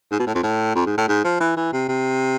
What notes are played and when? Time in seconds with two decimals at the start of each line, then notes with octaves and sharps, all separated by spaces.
0.11 G#2
0.19 B2
0.26 A2
0.35 F2
0.43 A2
0.75 F2
0.86 G#2
0.98 A2
1.08 G#2
1.24 F3
1.40 E3
1.56 E3
1.73 C3
1.88 C3